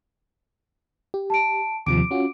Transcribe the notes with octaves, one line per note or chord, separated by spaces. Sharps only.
G4
A5 D7
D#2 C3 F3 D6 D7
C#4 F4 F#4